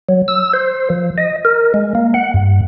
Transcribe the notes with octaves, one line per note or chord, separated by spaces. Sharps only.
F#3
E6
C5
F3
D#5
A#4
G#3
A#3
F#5
G2